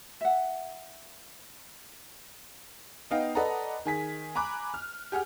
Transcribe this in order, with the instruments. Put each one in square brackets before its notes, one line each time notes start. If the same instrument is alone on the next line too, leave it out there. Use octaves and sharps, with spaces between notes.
[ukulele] E5 F#5
[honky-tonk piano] B3 D#4 D#5 F5 G5
A4 B4 D5 D#5 F#5 A#5
D#3 G#4 B6
G#5 A#5 B5 D6 F#6
F6
G4 G#4 F#5 F6